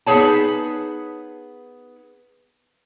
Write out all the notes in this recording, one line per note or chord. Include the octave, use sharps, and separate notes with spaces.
B3 D#4 G#4 C#5 A5